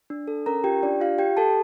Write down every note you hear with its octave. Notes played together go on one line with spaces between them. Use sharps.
D4
A4
C#4 A#4 A#5
F4 G4 G5
D4 F4 D5
F4 G4 F5
G4 G5
G4 A4 A5